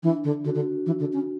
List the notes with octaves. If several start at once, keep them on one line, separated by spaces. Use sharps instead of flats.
E3 D4
D3
D3 F#4
D3
E3
D3
C#4